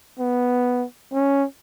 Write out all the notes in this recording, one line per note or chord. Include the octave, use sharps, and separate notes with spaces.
B3
C#4